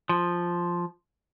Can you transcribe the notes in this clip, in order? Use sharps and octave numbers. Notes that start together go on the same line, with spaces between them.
F3